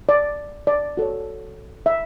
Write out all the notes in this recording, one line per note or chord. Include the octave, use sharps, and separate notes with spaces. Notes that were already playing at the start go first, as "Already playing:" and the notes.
D5
D5
F#4 A4 C#5
E5